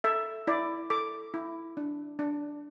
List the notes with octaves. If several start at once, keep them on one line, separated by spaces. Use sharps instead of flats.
A4 E5
E4 D5
A4 D6
E4
D4
D4